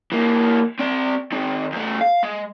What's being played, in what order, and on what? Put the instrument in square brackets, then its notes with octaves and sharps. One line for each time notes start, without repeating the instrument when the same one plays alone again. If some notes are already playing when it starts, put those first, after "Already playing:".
[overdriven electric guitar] E3 A#3
C4 D5
D#3 C4
E2 A3
F5
G#3